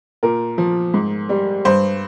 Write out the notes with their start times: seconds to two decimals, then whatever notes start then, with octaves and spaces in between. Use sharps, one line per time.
0.23 A#2 A#4
0.58 F3
0.94 G#2
1.29 G3
1.65 G2 C5